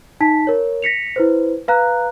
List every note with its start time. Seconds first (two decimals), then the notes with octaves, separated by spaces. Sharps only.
0.21 D#4 A5 B6
0.47 A#4 C#5
0.82 A#6 B6 C#7 F7
1.16 E4 B4 C5
1.68 B4 F5 A#5 F#6